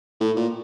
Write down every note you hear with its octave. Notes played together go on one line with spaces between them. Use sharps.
A2
A#2